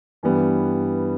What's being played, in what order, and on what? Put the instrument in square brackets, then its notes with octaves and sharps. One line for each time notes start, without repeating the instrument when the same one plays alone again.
[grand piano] G2 E3 G3 B3